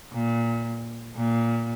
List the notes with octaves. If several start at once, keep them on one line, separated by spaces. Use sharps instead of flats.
A#2
A#2